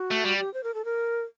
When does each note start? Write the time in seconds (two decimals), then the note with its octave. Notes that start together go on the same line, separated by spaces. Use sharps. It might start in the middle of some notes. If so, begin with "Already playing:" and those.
Already playing: F#4
0.11 A3
0.25 G3
0.39 G4
0.54 C5
0.64 A#4
0.74 A4
0.85 A#4